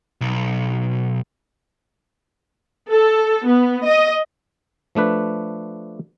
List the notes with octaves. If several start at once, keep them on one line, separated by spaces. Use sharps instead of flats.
B1
A4
B3
D#5
F3 A3 D4 B4